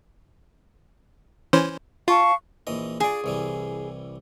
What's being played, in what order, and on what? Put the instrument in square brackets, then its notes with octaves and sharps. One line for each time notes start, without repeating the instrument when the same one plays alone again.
[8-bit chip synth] E3 C#4 C5
[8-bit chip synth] F4 [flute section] F5 A5 C#6
[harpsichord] A#1 E3 D#5
[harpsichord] F4 D5 [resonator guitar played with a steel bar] G#4
[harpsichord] C2 E3 G3